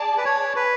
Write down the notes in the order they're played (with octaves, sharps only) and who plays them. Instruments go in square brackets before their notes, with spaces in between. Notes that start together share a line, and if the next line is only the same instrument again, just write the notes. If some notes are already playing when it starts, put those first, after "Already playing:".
Already playing: [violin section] G#4 D5 A5
[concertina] B4
C#5
B4